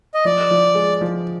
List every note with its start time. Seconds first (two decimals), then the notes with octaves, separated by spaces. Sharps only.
0.14 D#5
0.25 F3 D5
0.51 F3
0.75 G#3
1.01 F3